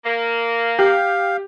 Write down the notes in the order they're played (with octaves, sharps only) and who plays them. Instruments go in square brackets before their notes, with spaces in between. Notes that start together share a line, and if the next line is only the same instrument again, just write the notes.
[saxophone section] A#3
[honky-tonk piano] G4 [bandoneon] F5